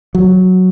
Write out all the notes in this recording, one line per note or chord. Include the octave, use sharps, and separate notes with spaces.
F#3